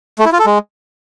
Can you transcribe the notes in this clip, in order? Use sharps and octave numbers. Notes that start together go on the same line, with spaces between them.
A3
E4
F4
A4
G#3